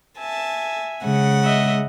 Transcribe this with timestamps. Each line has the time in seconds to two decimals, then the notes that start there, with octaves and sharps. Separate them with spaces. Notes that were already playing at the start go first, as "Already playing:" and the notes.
0.18 E5 G#5 A5
1.04 C#3 G#3 F#5
1.44 D#5 E5